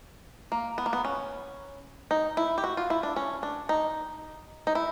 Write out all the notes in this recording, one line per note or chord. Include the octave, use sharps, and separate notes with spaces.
A#3
B3
A#3
B3
C#4
D#4
E4
G4
F#4
F4
E4
D4
C#4
D4
D#4
D#4
E4